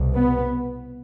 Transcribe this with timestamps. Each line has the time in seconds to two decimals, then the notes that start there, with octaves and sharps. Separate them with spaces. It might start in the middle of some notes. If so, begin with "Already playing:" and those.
Already playing: C2 B2
0.14 B3